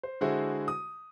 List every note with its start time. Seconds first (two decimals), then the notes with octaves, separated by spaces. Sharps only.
0.03 C5
0.21 D3 G#3 E4 F#4 G#4 C5
0.68 D#6